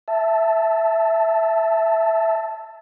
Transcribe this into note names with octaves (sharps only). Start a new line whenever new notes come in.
E5 A5